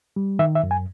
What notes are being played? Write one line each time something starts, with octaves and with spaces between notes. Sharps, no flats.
G3
D#3 E5
E5
F#2
G#5